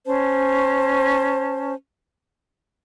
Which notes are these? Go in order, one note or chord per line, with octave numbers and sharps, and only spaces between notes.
C#4 C5 A5